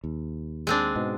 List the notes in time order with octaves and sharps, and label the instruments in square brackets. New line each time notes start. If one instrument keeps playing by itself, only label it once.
[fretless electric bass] D#2
[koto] G#3 C4 D4
[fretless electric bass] G#2 B2